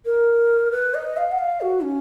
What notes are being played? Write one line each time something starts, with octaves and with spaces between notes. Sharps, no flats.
A#4
B4
D#5
F5
F#5
F5
F#4
C#4